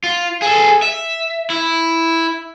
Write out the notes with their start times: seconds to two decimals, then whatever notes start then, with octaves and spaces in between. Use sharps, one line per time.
0.04 F4
0.42 G#4 A4
0.82 E5
1.50 E4